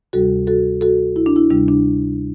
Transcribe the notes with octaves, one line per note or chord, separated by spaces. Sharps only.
D2 C3 G3 F#4 A4
F#4 A4
F#4 A4
E4
D4
E4
D2 C3 G3 D4
D4